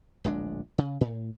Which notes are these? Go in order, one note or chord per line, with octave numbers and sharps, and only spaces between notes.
D1 A#1 G#3 D4
C#3
A2